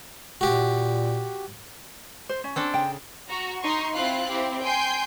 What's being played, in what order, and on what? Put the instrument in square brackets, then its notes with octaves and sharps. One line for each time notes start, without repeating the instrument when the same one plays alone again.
[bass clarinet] A#2 [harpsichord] F#4 G4
[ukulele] C5
C#4
[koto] C4 D4 A4
[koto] C#3 [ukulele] G5
[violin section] F#4 A#5
D#4 C6 C#6
C4 E4 F4 F5 F#6
C4 E4 G4
G5 G#5 C6 G6